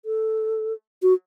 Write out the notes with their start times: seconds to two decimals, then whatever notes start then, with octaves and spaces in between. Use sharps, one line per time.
0.05 A4
1.02 F#4